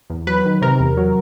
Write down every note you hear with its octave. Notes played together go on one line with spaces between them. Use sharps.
E2
F#3 B4
D#3
C3 A#4
E2
F#3